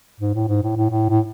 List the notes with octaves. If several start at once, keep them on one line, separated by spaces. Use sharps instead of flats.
G#2
A2
G#2
A2
A2
A2
A2